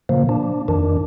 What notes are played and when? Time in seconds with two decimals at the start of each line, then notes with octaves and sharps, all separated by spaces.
0.09 A#2 C#3 F3 A#3
0.29 D4
0.68 F2 D#3 D4